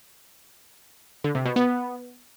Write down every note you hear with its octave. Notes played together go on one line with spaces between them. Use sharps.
D3
C3
B2
B3